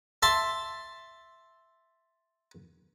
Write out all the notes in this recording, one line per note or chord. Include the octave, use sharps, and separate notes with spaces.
E5 A5 C6